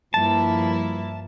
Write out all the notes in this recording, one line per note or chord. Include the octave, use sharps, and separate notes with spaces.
G2 F3 A#3 E4 A5